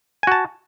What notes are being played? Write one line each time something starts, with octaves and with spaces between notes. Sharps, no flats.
F#4 G#5 A5